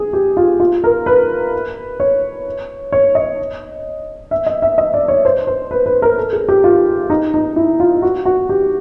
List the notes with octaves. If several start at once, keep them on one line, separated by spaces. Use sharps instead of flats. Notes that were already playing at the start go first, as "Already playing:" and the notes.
Already playing: G#4
G4
F4
F4
A#4
B4
C#5
C#5
D#5
E5
D#5
E5
D#5
D5
C#5
C5
C5
B4
B4
A#4
A4
G#4
G4
F4
D#4
D#4
E4
F4
F#4
F#4
G4